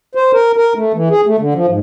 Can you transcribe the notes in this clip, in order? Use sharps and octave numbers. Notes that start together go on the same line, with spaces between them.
C5
A#4
A#4
A3
E3
G#4
A3
D3
F3
G#2